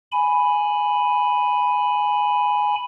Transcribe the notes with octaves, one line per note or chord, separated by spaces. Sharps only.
G#5 B5